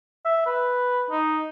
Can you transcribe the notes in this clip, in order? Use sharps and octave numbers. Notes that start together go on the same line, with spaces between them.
E5
B4
D#4